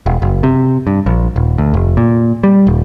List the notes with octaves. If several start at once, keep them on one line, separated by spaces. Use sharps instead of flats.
E1
F#1
C3
G2
A#1
D#1
D2
F1
A#2
G3
D#1